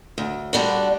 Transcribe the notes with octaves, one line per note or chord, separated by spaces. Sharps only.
D2
D3 G3 D4 F#4